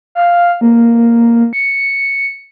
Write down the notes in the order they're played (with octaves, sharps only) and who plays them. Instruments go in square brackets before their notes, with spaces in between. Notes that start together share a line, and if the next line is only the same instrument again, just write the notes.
[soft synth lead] F5
A#3
C#7